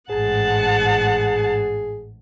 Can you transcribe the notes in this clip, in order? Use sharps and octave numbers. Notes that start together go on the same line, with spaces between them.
A1 G#2 G#4 F#5 A5